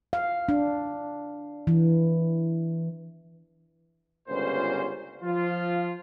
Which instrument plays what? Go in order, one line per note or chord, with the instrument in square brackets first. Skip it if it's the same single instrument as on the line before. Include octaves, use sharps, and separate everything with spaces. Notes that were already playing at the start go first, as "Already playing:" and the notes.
[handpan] F5
D4
E3
[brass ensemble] G1 C#2 A#2 C#4 B4 C5
F3 F4